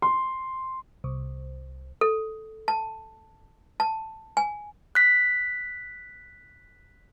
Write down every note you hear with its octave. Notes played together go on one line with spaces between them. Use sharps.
C6
C2
A4
A5
A5
G#5
F#6 B6